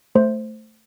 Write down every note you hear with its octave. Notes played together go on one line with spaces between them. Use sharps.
A3 C5